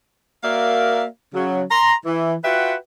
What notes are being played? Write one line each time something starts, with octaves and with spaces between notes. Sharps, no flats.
A#3 F#4 A#4 D5 E5 F5
C#3 F#3
A#5 C6
E3
F4 F#4 B4 E5 F#5 G5